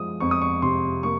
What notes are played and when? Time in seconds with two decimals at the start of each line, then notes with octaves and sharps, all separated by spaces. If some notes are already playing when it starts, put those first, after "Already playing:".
Already playing: F3 G#3 D#6
0.20 F2 C#6
0.31 D#6
0.41 C#6
0.62 C3 C6
1.03 A#3 C#6